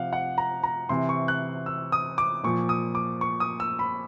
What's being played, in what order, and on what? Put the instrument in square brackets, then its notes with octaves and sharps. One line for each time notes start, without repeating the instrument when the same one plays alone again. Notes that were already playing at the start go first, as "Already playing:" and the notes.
Already playing: [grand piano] C3 F3 F5 F#5
F#5
A#5
A#5
C3 E3 C6
C#6
F#6
E6
D#6
D6
A#2 F3 C#6
D#6
D6
C#6
D#6
E6
B5